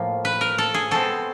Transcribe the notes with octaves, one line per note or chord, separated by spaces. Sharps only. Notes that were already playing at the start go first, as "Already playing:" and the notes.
Already playing: A2 F3 A#3
B4
A#4
A4
G#4
B2 G#3 C4 A4